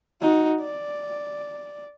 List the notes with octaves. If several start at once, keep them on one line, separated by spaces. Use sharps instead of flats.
D#4 F#4
D5